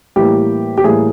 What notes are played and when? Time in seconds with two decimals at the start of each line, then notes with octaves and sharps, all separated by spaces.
0.16 A2 E3 G3 A#3 G4
0.78 G4
0.84 A2 E3 G3 A#3 G#4